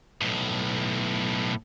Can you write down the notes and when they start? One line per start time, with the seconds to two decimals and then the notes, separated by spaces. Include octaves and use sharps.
0.22 B1 A2